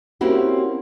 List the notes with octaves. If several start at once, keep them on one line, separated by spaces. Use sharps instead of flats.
A#3 C4 C#4 E4 F#4 G4